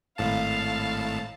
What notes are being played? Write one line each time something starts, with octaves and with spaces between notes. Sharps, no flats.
G#1 A2 F5 A5